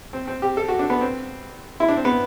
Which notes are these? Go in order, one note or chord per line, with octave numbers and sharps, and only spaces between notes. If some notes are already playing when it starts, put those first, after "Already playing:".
C4
C4
G4
A4
F#4
D4
B3
C4
E4
D4
C4
B3